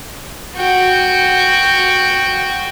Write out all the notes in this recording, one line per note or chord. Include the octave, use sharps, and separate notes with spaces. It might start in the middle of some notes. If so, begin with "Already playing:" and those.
F#4 G5